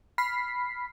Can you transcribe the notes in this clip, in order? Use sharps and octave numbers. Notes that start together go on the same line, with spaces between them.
B5 F6 B6 C7